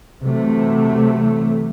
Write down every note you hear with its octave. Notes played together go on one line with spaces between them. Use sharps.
C3 E3 F#3 A3